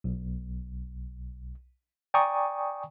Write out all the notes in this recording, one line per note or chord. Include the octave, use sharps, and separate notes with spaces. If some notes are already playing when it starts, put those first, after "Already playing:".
B1
D5 G5 G#5 A#5 C#6 D#6